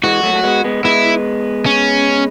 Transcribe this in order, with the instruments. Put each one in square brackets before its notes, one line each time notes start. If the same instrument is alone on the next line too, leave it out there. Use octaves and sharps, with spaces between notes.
[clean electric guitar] E3 G#3 [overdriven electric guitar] F#4
[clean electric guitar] F#3 A3
A3
G#3 B3
G#3 B3
[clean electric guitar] G#3 B3 [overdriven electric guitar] E4
[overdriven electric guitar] C#4